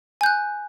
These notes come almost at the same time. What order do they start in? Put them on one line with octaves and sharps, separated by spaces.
G#5 G6 F#6